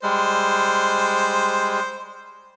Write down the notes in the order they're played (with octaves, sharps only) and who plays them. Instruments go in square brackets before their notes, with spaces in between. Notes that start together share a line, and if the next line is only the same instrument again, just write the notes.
[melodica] G3 G#3 [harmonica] C5